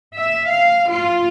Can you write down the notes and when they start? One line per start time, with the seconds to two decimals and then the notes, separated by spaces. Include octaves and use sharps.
0.15 E5
0.49 F5
0.90 F4